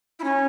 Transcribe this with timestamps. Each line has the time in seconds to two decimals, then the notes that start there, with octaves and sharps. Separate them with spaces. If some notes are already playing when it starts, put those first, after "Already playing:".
0.19 E4
0.24 C#4